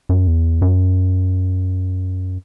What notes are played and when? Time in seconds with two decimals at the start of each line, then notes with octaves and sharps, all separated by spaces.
0.09 F#2
0.27 E2
0.62 F#2